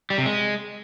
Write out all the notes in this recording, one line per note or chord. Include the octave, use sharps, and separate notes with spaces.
G3
C3
G#3